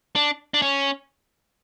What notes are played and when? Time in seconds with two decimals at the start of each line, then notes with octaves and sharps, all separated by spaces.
0.16 D4
0.54 D4
0.62 C#4